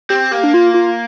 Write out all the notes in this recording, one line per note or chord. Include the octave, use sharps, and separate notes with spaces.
C4 G4
A#3 G4
D4
F4
F4